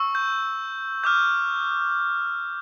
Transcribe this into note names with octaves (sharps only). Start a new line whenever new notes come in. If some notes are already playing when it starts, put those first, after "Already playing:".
Already playing: C#6 E6
G6
D6 F6 G6